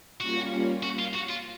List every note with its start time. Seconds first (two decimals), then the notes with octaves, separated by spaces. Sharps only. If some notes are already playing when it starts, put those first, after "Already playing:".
0.21 G3 A#3 C#4 F4 F#4
0.83 F#4
0.99 F4
1.15 F#4
1.30 F4